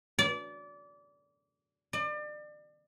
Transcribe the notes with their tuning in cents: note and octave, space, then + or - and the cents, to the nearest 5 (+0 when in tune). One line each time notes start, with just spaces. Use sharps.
D5 -25
D5 +35